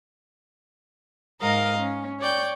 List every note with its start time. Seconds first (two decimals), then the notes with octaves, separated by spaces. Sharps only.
1.41 G#2 A#4 D#5 F5 A#5
1.79 C#4
2.20 C#5 D5 G5 G6